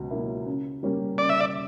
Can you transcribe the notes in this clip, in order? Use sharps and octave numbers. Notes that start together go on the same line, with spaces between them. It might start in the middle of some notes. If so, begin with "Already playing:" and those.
Already playing: C#2 B2 F#3
B2 F#3 A#3 E4
C#3
G3 A#3 C#4 G4
C#3 D5
E5
D5